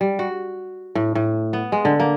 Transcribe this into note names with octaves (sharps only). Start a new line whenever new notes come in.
G3
F#4
A2
A2
B3
G#3
D3
A#3